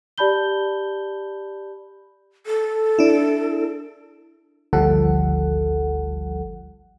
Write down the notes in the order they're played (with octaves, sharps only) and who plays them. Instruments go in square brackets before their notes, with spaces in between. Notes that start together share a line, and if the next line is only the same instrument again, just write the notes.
[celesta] G4 D5 A5 B5 G6 G7
[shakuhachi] A4
[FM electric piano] D4 E4
G#1 D2 F3 G3 A4 F#5